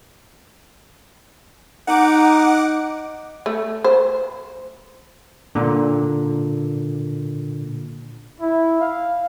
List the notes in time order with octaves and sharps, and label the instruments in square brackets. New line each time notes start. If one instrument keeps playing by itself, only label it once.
[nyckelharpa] D#4 [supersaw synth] F#5 D6
[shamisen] A3
C5
[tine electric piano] A#2 D3
[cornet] E4
F5